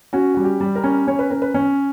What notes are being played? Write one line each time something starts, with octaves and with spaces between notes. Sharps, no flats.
C#4 F#4
G3 F#4
G4
G3
A#4
C#4
C#4 C#5
B4
C#4 A#4
B4
C#4 C#5